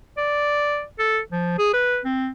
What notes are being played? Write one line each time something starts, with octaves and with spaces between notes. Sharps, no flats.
D5
A4
F3
G#4
B4
C4